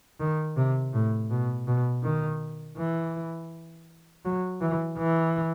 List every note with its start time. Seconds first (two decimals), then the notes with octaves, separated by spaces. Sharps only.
0.20 D#3
0.57 C3
0.94 A2
1.31 B2
1.67 B2
2.03 D#3
2.77 E3
4.25 F#3
4.61 E3
4.98 E3